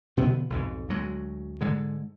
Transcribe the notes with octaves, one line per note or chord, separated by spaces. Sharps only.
B2 D3 F3 B3
B1 F2 G#2
D2 F#3 G#3
G#2 D3 G#3